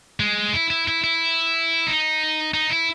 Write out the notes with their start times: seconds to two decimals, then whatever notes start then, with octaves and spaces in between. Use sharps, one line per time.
0.20 G#3
0.53 E4
0.70 E4
0.87 E4
1.04 E4
1.87 D#4
2.54 D#4
2.70 E4